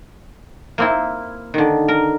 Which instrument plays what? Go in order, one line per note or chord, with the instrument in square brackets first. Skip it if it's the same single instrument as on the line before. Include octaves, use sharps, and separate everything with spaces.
[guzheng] A#3 C4 E4
D3 D#3
A#4